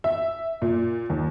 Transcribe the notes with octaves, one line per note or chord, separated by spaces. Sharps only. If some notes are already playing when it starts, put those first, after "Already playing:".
E5
A#2
D#2